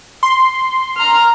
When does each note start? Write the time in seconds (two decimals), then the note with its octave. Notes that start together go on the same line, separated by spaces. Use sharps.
0.23 C6
0.97 A#5 F6